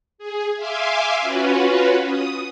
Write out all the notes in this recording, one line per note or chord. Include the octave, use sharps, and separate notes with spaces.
G#4
E5 F5 G#5 C6 D6
C#4 F4 F#4 B4
D#6